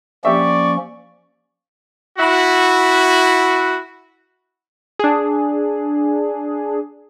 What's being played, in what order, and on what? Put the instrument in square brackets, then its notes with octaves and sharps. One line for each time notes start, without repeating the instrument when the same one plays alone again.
[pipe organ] F3 A#3 C#4 [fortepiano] G4 E5 [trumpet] D5 [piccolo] C#6
[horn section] E4 F#4
[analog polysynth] D4 G#4